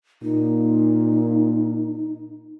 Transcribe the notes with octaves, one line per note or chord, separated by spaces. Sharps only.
A#2 D#4